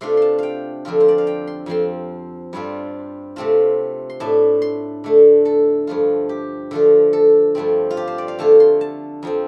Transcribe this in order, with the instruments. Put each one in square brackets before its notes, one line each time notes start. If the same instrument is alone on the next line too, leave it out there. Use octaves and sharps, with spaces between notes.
[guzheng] C3 A3 D4 F4 C6
A5 C6
F5 G5
F2 D3 F3 C4 F4
C5
D5
F5
G5
C6
F2 F3 C4 C6
G2 G3 C4 F4
C3 A3 C4 F4 A5
C6
A2 A3 D4 A5
C6
D3 A3 D4
A4
G2 F3 A3 F4
G4
D3 F3 A3 F4
A4
G2 F3 A3 C4
F4
G4
C5
D5
F5
D3 A3 F4 A5
C6
A5
F2 F3 C4